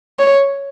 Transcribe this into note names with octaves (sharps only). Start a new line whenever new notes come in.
C#5